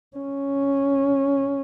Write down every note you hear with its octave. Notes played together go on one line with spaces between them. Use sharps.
C#4